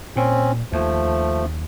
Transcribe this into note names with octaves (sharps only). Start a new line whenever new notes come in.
A#2 C4 C#4
D#2 F3 A3